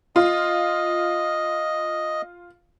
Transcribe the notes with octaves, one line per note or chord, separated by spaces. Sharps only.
F4 D#5